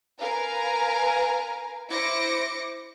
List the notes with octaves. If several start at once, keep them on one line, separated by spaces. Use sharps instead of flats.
A#4 B4 F5 G#5 A#5
E4 C5 D6 A#6 C#7 D7